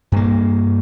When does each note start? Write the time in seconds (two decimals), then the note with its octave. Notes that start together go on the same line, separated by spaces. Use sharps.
0.12 G2 A#3